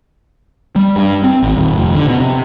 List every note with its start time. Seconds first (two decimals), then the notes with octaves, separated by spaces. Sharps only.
0.76 G3
0.96 G2
1.24 C4
1.43 G#1
1.56 D#1
1.78 F1
1.94 D3
2.08 B2
2.20 C3